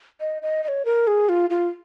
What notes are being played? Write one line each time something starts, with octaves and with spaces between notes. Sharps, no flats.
D#5
D#5
D#5
C#5
A#4
G#4
F4
F4